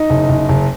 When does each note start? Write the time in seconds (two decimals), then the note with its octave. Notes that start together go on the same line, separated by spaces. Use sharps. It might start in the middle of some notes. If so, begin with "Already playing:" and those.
Already playing: D#4
0.10 F#1
0.29 F#1
0.49 F#1